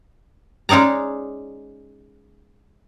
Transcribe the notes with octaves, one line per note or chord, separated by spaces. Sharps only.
G#3 C#4 D#4 D5 A#5